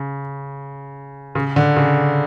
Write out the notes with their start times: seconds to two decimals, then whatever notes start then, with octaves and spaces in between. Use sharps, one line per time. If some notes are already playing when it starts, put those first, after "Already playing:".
Already playing: C#3
1.35 C#3
1.56 D3
1.76 C#3